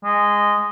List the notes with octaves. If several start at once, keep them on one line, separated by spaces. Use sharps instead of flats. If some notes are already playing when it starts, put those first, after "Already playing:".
G#3